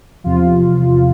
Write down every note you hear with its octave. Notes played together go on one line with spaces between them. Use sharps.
E2 C3 F3 F4